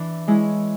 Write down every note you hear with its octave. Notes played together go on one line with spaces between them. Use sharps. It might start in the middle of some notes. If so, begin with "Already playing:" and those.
Already playing: E3 D4
G#3 C#4 E4